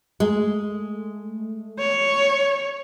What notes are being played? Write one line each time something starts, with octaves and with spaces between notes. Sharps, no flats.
G#3 A3
C#5